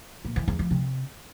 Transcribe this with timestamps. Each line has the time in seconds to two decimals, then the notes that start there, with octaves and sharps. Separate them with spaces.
0.25 A#2
0.36 E3
0.48 E2
0.59 F3
0.71 C3